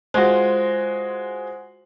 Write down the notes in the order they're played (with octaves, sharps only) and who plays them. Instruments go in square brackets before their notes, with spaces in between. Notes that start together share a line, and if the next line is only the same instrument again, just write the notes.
[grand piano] G#3 F4 F#4 [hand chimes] C5